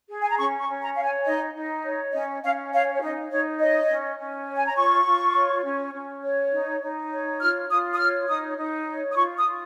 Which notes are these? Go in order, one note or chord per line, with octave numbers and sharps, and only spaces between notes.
G#4
G#5
A#5
C#4 C#6
C#6
C#4
A#5
C#5 F5
G#5
D#4 D#5
D#4
C#5
C#4 D#5
C#4 F5
C#5 F5
C#5
D#4 D#5
D#4 C#5
C#5 D#5
C#4
C#4
C#5
G#5
A#5
F4 C#6
F4
C#5
C#4
C#4
C#5
D#4
D#4
C#5
F4 F6
F4 D#6
D#6
C#5 F6
D#4 D#6
D#4
C#5
D#6
F4 C#6
D#6
F4